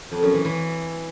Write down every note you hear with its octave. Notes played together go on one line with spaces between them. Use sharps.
F2
F#2
E3
E3